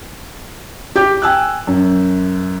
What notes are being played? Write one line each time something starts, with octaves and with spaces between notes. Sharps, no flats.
G4 G6
G5 G#5 E6 F#6
F#2